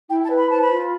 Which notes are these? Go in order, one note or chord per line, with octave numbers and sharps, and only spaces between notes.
E4 G5
A5
B4
B5
C5 A5
B5
F4